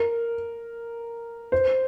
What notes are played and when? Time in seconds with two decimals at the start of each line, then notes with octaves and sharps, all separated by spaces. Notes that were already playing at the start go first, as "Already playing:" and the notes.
Already playing: A#4
1.52 C5